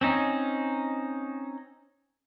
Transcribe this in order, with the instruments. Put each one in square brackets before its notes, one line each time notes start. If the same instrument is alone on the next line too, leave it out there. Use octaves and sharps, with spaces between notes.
[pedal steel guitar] C4 C#4 D#4